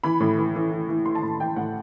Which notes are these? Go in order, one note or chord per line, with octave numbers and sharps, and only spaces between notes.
E3 B5
A2
E3
E3
E3
E3
E3 C6
A5
A2 B5
E3 G5
A2 F#5